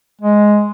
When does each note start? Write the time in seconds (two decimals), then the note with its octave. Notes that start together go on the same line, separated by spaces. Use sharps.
0.21 G#3